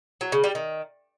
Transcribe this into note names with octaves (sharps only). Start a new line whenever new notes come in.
F#3
C#3
G3
D#3